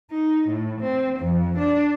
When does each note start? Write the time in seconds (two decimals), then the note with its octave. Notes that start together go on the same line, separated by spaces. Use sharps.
0.11 D#4
0.48 A2
0.81 C4
1.20 F2
1.58 D4